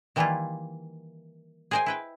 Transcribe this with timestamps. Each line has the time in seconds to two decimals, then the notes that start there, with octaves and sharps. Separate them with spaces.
0.16 D#3 E3 G3 A#3 E4 F4
1.71 G#4 A#4 C5 D#5 G5 G#5
1.86 E4 B4 G5